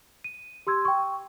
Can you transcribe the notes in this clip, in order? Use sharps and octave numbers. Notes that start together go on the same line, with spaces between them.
D#7
G4 C6 E6 G#6
G5 C#6